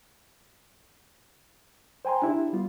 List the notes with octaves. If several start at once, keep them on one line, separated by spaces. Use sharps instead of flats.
C5 G5 G#5 A#5 C6
D4 E4 G4 E5
G3 B3 F4